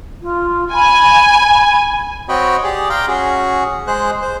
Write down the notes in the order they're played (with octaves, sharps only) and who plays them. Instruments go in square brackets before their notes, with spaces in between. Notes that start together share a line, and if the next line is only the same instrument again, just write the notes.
[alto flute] F4
[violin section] G#5 [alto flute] B5
[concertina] C4 F#4 C#5 D#5 G5 B5
G4 G#4 D5
F5 G5 A#5 C6
C#4 F#4 G#4
G#3 G#4 C5 F#6
C5